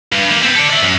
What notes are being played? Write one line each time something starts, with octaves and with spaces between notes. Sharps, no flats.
G2
A#3 G4
B3 C4
A4 D5
D5 E5
F#2